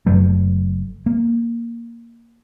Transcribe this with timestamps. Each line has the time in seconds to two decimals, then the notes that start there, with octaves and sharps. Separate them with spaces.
0.06 F#1 F#2 F#3 A3
1.06 A#3